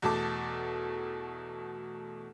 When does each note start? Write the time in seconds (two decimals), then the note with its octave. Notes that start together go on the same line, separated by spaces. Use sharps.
0.02 E2 B2 A3 A4 A5 D6